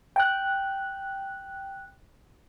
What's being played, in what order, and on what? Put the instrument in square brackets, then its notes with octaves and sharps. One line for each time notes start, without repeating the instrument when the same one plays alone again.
[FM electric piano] G5 F#6